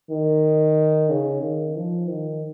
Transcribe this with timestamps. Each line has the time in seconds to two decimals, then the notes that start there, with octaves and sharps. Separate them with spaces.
0.11 D#3
1.09 C#3
1.42 D#3
1.76 F3
2.08 D#3